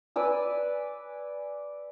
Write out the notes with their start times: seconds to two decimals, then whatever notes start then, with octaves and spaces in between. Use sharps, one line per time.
0.16 B4 D5 G#5 E6